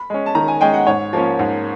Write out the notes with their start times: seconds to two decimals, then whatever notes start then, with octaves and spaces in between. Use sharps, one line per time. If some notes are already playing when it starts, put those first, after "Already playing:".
Already playing: B5
0.10 G#3 C#4
0.26 A5
0.35 D#3 A#5
0.48 G#5
0.61 G#3 C#4 G5
0.74 F#5
0.87 G#2 C#5
1.13 F3 A#3 C#4
1.39 G#2